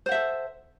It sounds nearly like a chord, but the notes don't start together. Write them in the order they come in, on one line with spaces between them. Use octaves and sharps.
C5 F#5 E5 A4